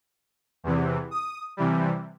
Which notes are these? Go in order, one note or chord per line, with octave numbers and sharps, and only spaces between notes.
E2 C3 E3
D#6
C3 E3 G3